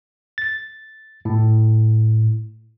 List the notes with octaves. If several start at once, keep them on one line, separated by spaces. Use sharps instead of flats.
A6
A2